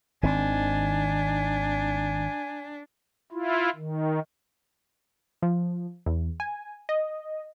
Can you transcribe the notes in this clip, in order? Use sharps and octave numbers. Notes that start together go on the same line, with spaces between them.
G#1 D#3 C4 D4 G#5
E4 F4
D#3
F3
E2
G#5
D#5